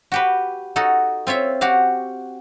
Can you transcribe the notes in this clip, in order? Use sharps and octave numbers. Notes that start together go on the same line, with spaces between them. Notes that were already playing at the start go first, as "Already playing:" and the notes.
F#4 G4 B4
D#4 F#4 A4
C4 F4 C#5 E5
F#4 G4 F5